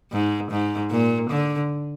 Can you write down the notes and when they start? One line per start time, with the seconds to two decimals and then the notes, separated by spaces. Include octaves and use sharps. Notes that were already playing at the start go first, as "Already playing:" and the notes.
0.12 G#2
0.51 G#2
0.91 A#2
1.30 D3